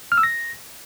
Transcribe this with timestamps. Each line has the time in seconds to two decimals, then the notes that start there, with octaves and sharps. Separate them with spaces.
0.12 F6
0.18 E6
0.23 A#6